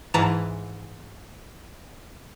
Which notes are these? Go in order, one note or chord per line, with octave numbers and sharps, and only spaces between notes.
G#2 E3 A5 A#5 E7